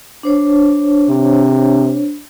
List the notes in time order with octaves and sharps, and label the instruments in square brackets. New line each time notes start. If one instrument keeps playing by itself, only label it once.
[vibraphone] D4 C5 C#5
[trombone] C3